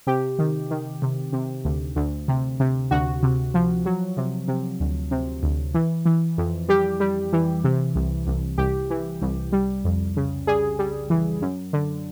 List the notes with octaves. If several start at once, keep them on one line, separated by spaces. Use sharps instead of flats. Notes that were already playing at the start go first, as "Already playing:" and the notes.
C3 G4
D#3
D#3
C3
C3
D2
D2
C3
C3
D2 F#4
C3
F3
F#3
C3
C3
D2
C3
D2
E3
E3
F2
G3 G4
G3
E3
C3
C2
C2
C2 G4
E3
C2
G3
F2
C#3
G3 G#4
G3
E3
F#2
D3